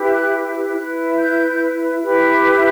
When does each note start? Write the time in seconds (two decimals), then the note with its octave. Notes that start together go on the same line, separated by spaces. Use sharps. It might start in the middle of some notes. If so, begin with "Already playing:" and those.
Already playing: E4 G4 B4
0.11 F#6
0.75 E4 B4 F#6
1.17 G6
2.01 E4 G4 B4